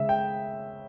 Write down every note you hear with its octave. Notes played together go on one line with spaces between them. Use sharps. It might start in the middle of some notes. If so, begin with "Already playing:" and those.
Already playing: C#3 G#3 E5
G5